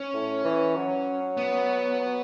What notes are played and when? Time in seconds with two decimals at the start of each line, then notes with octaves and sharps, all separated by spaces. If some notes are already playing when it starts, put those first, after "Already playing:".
Already playing: C#4
0.14 A2
0.44 E3
0.76 F#3
1.37 B3
2.00 F#3